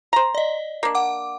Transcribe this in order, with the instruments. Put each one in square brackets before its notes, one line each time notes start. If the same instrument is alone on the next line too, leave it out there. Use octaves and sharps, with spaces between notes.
[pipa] C5 A#5
[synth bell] D5 D#5
[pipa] A#3 D4
[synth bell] F#5 D6